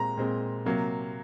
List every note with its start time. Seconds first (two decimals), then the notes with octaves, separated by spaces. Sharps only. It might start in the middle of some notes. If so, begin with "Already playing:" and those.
Already playing: A#2 G#3 C4 A#5
0.17 A#2 G#3 C4
0.65 C3 F#3 A#3